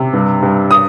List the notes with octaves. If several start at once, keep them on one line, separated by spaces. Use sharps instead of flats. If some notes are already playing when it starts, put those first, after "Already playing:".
Already playing: C3
G2
G2
D#6